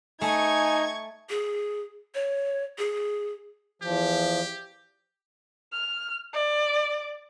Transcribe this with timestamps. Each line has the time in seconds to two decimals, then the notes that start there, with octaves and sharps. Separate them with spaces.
0.21 A3 D#4 G#5 C#6 G#6
1.29 G#4
2.15 C#5
2.78 G#4
3.82 E2 F3 G4
5.73 F6
6.34 D5